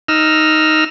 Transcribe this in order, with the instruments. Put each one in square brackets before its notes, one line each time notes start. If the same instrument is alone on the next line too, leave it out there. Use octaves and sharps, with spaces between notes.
[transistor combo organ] D#4 E6 F6